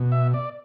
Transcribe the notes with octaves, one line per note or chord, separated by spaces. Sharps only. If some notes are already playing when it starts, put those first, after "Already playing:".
Already playing: B2
E5
D5